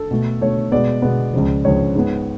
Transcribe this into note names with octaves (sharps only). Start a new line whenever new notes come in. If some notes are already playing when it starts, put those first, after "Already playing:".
Already playing: A4
B2 A3
B2 A3 C#5
B2 G#3 B3 D5
B2 G#3 B3
C#2 C#3 F3
C#2 C#3 F3 C#5
G#2 G#3 B3